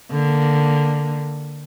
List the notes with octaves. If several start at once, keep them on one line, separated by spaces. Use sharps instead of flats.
D3 A#3